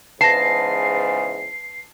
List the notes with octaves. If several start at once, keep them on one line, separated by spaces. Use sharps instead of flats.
E2 G#2 C#3 B4 A5 A#6 C7